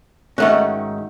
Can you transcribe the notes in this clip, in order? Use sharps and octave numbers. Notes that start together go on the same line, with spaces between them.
G#2 D#3 A3 C#4 F#4